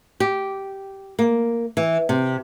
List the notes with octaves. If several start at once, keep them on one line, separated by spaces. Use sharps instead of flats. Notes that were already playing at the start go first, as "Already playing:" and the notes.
G4
A#3
E3
C3